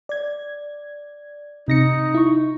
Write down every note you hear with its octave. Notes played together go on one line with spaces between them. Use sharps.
D5 G#6
C3 D#4 A#6 C#7
E4 C#6